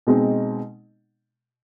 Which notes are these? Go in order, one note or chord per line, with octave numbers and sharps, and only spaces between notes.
B2 G#3 C4 D#4